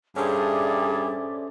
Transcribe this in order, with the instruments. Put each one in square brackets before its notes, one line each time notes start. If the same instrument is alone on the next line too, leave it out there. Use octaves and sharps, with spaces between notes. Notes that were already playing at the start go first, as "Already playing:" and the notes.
[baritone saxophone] G2 [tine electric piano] C#4 A4 C5 [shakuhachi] G#4 [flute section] D5 E5 D6